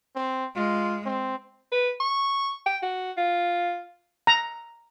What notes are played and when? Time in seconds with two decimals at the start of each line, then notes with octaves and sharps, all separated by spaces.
0.16 C4
0.56 G#3 F4
1.05 C4
1.72 B4
2.00 C#6
2.66 G5
2.83 F#4
3.18 F4
4.27 A#5